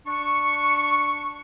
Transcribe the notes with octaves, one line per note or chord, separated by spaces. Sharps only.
D4 C#6